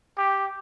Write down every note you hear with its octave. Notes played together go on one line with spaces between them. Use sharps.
G4